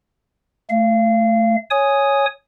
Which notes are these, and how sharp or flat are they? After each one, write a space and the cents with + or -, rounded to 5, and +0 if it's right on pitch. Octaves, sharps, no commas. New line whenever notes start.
A3 +0 F5 -30
C#5 +0 G#5 +0 D#6 +0